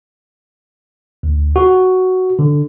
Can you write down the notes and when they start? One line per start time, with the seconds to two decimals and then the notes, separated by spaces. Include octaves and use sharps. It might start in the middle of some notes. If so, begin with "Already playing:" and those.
1.23 D2
1.56 F#4
2.39 D3